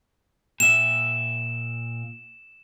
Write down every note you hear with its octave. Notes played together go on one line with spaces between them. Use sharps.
A#2 E5 E7